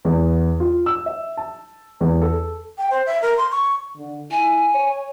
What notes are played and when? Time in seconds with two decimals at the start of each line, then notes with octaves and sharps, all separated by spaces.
0.05 E2
0.60 F4
0.86 E6
1.06 E5
1.37 A5
2.01 E2
2.22 A4
2.78 G5
2.91 C5
3.06 E5
3.22 A#4
3.37 C6
3.51 C#6
3.96 D3
4.31 E4 G#5
4.75 C#5